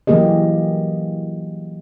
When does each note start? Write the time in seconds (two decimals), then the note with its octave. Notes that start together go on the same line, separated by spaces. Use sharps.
0.07 E3 F#3 A#3 G4 G#4 D#5